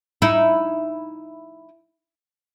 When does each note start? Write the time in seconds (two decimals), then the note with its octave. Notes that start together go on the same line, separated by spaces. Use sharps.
0.22 D#4 E4